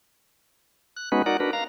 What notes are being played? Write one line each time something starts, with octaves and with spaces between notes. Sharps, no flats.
F#6
G#3 B3 C#4 D#4 F#4 B4
D#4 F#4 A#4 D5 F#5
D4 F#4 A#4 B4
F5 A#5